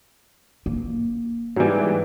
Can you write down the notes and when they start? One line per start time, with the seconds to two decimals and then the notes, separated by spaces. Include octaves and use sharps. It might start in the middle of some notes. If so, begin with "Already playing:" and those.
0.66 A#3
1.56 G#2 E3 F#3 G3